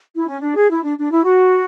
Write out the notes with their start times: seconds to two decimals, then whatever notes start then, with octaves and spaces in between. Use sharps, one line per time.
0.14 E4
0.27 C#4
0.42 D4
0.55 G#4
0.69 E4
0.83 D4
0.98 D4
1.11 E4
1.25 F#4